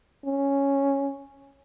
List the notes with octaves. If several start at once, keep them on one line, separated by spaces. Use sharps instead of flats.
C#4